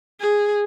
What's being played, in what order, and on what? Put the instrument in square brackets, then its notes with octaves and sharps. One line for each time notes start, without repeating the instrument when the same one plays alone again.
[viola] G#4